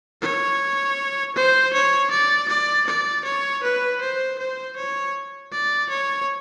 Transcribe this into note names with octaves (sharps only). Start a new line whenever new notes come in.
C#5
C5
C#5
D5
D5
D5
C#5
B4
C5
C5
C#5
D5
C#5